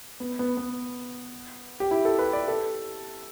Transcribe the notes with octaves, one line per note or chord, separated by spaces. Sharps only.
B3
B3
B3
G4
E4
A4
B4
D5
A4